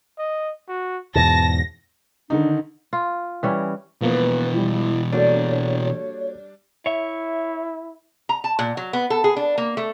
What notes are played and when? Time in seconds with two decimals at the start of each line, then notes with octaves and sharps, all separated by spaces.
0.18 D#5
0.69 F#4
1.15 E2 G#2 B2 A5 A#6
2.30 D3 D#3 D4 D#4
2.93 F4
3.43 E3 G3 C#4
4.02 B2 E3 F3 A#3 B3 B4
4.53 F3 G3 E4
5.12 G3 A#3 D4 F#4 A4 C#5
6.86 E4 C#5 E5
8.29 A#5
8.44 A5
8.59 A#2
8.77 F#3
8.93 B3
9.10 A4
9.24 G#4
9.36 D4
9.58 A#3
9.77 A3